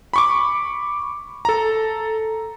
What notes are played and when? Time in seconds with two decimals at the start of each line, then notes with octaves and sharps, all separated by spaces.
0.13 B5 C#6 D6
1.45 A4 A#5